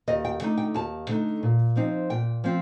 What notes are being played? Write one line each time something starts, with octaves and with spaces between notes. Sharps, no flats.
D#2 D#5
G5
D3 A3 D#4
G5
D#2 A5
D3 A3 D#4
A#2
F3 C4 D#4
A#2 G5
F3 C4